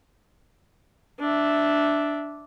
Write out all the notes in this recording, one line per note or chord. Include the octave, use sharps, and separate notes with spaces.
D4 E5